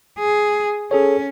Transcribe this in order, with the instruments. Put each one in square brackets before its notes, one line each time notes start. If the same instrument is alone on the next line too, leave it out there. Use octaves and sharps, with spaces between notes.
[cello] G#4
[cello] C#4 [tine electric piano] G#4 A4 C#5